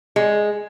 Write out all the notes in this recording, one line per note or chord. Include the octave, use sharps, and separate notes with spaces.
G#3